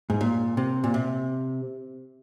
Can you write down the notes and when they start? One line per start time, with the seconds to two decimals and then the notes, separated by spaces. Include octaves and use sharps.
0.10 G#2
0.21 A#2
0.57 C3
0.84 A#2
0.94 C3